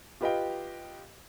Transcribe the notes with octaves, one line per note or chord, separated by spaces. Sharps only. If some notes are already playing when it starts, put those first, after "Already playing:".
F4 G4 B4 D#5 F5 G5